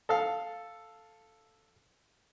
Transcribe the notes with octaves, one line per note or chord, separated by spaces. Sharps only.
A4 F5